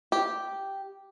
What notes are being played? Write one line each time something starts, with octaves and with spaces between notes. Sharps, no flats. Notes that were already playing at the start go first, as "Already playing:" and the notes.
G4